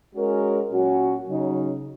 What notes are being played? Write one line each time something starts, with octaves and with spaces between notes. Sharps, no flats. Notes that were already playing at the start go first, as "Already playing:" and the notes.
G#3 C#4 F#4 A#4
A#2 F#3 C#4 F#4
C#3 F#3 D#4